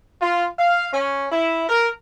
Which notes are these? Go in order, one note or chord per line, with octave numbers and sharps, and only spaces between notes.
F4
F5
C#4
E4
A#4